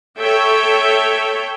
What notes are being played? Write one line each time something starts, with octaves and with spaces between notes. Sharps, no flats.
A4 C#5 E5 G5